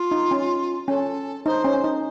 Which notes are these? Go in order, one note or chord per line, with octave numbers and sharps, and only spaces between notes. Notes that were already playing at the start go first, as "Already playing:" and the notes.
Already playing: F4
D#4
C#4
C#4 A4
D#4 C5
C#4
D#4